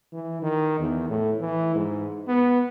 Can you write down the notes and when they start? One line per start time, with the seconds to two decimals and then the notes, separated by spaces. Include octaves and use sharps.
0.13 E3
0.42 D#3
0.79 E2
1.10 A2
1.40 E3
1.75 G#2
2.28 B3